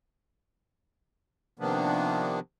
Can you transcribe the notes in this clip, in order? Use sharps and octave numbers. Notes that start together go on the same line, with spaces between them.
C3 D#3 F3 A#3 B3 D4